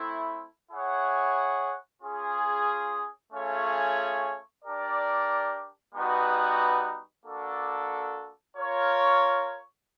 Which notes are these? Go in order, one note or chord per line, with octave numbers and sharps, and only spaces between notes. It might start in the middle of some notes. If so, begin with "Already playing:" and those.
Already playing: A3 C4 E4
E4 G#4 C#5 F#5
C#4 F4 G#4
A3 C#4 F4 G#4 C#5
D4 G4 A#4 D5
G3 B3 D#4 F#4 B4
A#3 D4 F#4 A4
F4 A#4 C#5